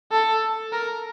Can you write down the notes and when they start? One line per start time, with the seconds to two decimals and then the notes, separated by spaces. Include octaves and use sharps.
0.12 A4
0.73 A#4